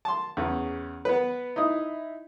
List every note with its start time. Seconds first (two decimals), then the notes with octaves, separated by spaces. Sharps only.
0.05 A5 C6
0.37 E2 C#3
1.05 B3 B4
1.56 D#4 E4 D#6